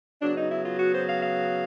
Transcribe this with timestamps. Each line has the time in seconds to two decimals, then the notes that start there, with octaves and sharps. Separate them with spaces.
0.21 C#3 F#3 B3 D4
0.36 D#4
0.51 E4
0.64 F4
0.78 F#4
0.93 C5
1.07 F5
1.22 F5